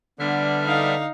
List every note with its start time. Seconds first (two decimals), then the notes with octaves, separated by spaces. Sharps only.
0.20 D3 G3 B3 D4 E5 F6
0.65 D#4 F5